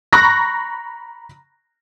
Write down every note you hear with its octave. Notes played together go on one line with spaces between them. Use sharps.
A#5 B5 C#6 F#6 A#6